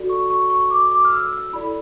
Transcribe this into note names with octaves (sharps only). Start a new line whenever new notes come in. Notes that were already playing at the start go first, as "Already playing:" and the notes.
Already playing: F#4 A4 D5
C#6
C#6
C#6
D6
D6
F6
E6
E6
E4 A4 D5 B5